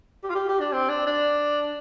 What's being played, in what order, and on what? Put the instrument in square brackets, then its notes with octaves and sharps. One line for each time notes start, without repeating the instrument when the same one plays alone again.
[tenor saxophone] G4
F4
G4
G4
D4
C4
D4
D4